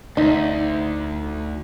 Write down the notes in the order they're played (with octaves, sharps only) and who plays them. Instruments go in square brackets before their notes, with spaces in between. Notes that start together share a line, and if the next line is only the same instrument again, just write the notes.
[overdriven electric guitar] D2 [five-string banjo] D#4